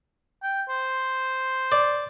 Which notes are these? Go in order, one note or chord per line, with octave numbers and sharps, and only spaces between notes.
G5
C5
D5